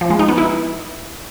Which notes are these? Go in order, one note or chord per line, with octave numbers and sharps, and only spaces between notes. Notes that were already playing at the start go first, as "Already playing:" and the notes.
F3
G#3
D#4
B3
E4